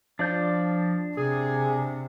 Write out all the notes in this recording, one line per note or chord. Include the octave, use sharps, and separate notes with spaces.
F3 D4 D5 G6
C3 G#4